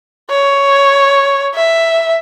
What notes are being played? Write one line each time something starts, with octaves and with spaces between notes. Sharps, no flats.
C#5
E5